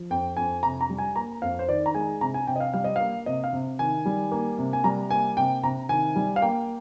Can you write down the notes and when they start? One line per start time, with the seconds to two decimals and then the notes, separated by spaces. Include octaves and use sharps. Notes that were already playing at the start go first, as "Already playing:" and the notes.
Already playing: F3
0.10 F2 G5
0.37 F2 G#5
0.63 C3 A#5
0.81 A#5
0.90 G3
0.98 G#5
1.16 A#3 A#5
1.42 F2 F5
1.59 C5
1.69 D#3 D5
1.86 A#5
1.95 G#3 G#5
2.21 C3 A#5
2.34 G#5
2.47 C3 G5
2.56 D#5
2.60 F5
2.74 G3 F5
2.84 D#5
2.96 A#3 F5
3.26 C3 D#5
3.44 F5
3.53 C3
3.79 D#3 G#5
4.06 G3
4.32 A#3
4.58 C3
4.73 G#5
4.84 G3 A#5
5.11 A#3 G#5
5.37 C3 G5
5.63 C3 A#5
5.89 D#3 G#5
6.16 G3
6.36 F5
6.42 A#3 G5